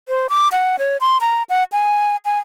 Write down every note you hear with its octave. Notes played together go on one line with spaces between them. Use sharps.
C5
D6
F#5
C#5
C6
A#5
F#5
G#5
G#5